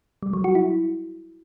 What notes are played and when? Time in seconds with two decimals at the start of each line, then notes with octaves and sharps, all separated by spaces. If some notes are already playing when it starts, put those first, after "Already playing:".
0.23 G3
0.33 F#3
0.44 F#4
0.55 E4